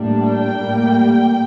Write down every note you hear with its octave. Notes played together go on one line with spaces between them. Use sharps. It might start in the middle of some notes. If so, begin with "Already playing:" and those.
Already playing: A2 G3 A#3 D4
G5
A2 G3 A#3